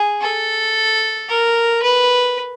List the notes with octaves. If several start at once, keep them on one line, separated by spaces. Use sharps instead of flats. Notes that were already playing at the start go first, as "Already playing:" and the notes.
Already playing: G#4
A4
A#4
B4